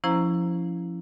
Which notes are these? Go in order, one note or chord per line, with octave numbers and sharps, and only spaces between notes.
F3 C#4 E4 C5 A#5